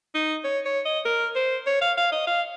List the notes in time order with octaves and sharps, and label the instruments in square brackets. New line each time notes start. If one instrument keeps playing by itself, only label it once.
[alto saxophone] D#4
C#5
C#5
D#5
A#4
C5
C#5
F5
F5
D#5
F5